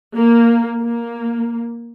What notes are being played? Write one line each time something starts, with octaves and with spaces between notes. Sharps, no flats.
A#3
A#3